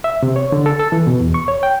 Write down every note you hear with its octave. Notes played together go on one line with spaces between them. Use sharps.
E5
C3
C#5
D3
A4
A4
E3
B2
E2
C#6
C#5
G5